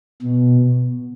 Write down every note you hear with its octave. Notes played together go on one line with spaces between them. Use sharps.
B2